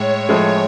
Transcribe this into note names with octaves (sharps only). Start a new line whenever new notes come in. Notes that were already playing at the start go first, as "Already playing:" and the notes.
Already playing: A2 G#3 C#5
A2 F3 G#3 C#5